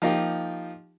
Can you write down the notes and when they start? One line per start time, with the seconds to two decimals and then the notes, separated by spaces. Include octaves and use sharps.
0.02 F3 A#3 D#4 F4 G4